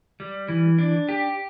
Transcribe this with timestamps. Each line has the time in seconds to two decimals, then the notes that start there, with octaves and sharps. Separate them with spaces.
0.20 G3
0.48 E3
0.78 D4
1.09 G4